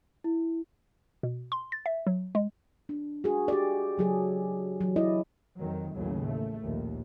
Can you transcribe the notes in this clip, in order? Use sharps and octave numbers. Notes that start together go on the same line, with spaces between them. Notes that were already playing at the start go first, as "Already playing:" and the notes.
E4
B2
C6
A6
E5
F#3
G#3
D4
F#4 G#4
G4 D5
C#3 F#3 G#4 A4
E3 F#3
E4 D5 D#5
F2 D#3 F#3
A1 D#2 A2 C#3 F#3
A3
A#1 D#2